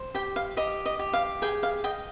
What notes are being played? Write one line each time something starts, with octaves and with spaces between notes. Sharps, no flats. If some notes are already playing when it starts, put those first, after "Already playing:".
Already playing: C5
G4 G5
F5
G4 D#5
D#5
G4
F5
G#4 G5
F5
D#5 G5